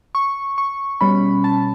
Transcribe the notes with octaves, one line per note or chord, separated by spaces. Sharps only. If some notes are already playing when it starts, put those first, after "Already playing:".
C#6
C#6
B2 G3 C#4 B5
A5